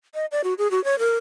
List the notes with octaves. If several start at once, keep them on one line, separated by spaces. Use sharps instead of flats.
D#5
D5
F#4
G#4
F#4
C#5
A#4